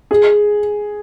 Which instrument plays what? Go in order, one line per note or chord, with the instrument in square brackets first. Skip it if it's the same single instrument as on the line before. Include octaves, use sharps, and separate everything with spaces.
[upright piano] G#4